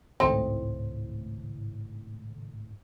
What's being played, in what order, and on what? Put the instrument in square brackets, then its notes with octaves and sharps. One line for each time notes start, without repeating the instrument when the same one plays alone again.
[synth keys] G#1 C#2 A2 [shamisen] C4 D#4 A4